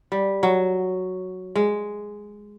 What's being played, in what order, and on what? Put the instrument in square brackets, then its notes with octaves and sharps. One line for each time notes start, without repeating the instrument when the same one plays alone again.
[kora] G3
F#3
G#3